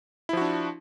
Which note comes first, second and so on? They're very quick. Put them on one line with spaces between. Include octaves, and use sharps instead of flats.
E4 F3 F#4 D4